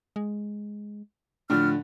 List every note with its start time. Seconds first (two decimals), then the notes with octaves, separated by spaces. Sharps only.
0.16 G#3
1.50 A2 D3 F3 D4 F6